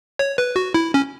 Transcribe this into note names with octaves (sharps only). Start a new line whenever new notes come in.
C#5
B4
F#4
E4
C#4